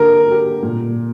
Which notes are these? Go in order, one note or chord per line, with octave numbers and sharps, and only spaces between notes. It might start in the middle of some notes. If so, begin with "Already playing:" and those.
Already playing: D3 A#3 G4 A#4
A#3 G4
A#2